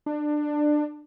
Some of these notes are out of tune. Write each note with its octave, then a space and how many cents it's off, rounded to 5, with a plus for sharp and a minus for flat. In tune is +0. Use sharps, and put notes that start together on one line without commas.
D4 +20